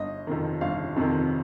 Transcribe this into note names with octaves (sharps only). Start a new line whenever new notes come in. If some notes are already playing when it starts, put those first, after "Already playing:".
Already playing: G1 D#5
F2 C3 D#3
G1 F5
F2 C3 D#3